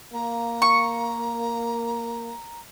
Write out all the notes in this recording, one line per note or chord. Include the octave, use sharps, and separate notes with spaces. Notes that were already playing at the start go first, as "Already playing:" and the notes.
A#3 A#5
C#6